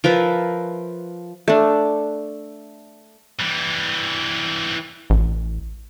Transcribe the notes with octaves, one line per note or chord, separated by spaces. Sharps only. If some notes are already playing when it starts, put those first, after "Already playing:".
F3 A#4 B4 E5
A3 D4
E3 G3
A1